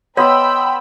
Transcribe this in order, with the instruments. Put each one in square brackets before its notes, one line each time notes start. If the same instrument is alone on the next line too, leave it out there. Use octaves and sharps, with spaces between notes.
[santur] B3 D#5 E5 [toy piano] C#5 [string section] G5 B5 E6 [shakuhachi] C6